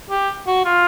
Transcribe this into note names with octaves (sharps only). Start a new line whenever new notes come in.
G4
F#4
F4